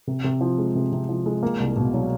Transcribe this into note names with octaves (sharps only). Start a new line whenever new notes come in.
C3
C3
F3
G#3
C3
C3
F3
G#3
A#3
C2
B2
F#3